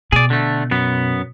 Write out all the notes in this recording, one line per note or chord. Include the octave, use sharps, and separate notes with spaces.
B2 G#4 D5
D3 A3
F#2 B3